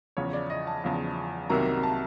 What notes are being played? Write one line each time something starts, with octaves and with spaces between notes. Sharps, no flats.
E2 C#3 F3 C#5
D5
D#5
A5
E2 C#3 F3
C2 C3 D#3 F#3 A#3 A#5
A5